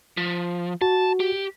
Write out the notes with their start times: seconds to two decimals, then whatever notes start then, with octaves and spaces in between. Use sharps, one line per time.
0.17 F3
0.82 F#4 A5
1.20 G4